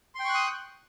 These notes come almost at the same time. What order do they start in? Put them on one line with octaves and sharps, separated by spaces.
C6 G5 C#6 F#6 D#6